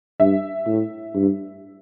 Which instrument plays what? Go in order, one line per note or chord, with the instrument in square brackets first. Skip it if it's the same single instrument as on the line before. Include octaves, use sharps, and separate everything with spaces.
[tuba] G2 [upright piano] E5
[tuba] A2
G2